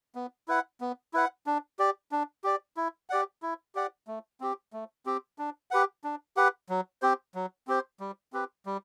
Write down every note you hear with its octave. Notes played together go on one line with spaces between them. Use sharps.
B3
E4 B4 F#5
B3
E4 B4 F#5
D4
G4 D5
D4
G4 D5
E4
G4 D5 F#5
E4
G4 D5 F#5
A3
C4 G4
A3
C4 G4
D4
G4 B4 F#5
D4
G4 B4 F#5
F#3
C4 G4 C5
F#3
C4 G4 C5
G3
C4 G4 B4
G3